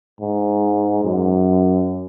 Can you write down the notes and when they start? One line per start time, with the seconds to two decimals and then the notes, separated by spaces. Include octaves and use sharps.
0.21 G#2
1.04 F#2